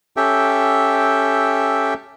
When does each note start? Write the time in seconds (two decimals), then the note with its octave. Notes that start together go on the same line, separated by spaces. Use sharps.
0.17 C#4 G4 A4 E5 G5